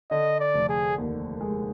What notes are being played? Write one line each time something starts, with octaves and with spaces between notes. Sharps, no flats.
D3 D#5
D5
F1
G#4
D#2
G#3